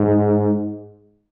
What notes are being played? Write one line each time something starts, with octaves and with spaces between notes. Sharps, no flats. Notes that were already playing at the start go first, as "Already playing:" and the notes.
Already playing: G#2